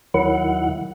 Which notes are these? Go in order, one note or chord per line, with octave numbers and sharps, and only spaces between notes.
D#2 D#3 F#3 E4 F#5